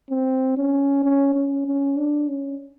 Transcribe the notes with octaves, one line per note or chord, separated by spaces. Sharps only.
C4
C#4
C#4
C#4
C#4
D4
C#4